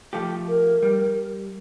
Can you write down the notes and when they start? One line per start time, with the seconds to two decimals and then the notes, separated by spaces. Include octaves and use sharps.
0.13 F3 A3 G4
0.48 A#4
0.83 G3